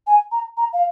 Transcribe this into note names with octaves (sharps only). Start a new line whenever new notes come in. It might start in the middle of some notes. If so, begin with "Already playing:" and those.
G#5
A#5
A#5
F5